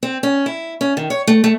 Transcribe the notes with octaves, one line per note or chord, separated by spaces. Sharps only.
C4
C#4
E4
C#4
D#3
C#5
A3
A3